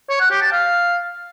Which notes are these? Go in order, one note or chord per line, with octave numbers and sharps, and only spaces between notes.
C#5
F#5
G4
A5
F5